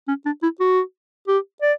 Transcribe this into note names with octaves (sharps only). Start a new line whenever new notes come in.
C#4
D4
E4
F#4
G4
D5